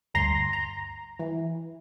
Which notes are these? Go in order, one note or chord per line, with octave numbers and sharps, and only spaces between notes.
G1 D2 A#5 C6 A#6
A#5
E3